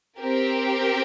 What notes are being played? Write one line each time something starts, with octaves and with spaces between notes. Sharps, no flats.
C4 G4 A#4